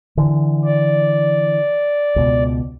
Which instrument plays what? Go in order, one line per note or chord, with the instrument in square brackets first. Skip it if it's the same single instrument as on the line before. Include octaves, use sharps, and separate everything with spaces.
[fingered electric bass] D3 E3
[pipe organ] D5
[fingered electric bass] C#2 B2